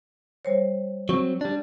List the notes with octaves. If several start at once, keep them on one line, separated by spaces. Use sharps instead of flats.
G3 C5 C#5
F#3 C4 C#6
G3 D4